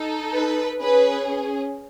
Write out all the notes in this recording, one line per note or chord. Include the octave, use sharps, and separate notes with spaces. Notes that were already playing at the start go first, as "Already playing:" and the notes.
Already playing: D#4 A4
B4
C#4 G#4 B4